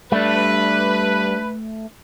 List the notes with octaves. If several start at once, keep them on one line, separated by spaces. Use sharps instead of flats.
G3 A3 D4 B4